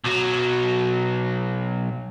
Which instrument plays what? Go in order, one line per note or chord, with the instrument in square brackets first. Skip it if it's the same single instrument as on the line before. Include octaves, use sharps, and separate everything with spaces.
[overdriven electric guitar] B1 F#3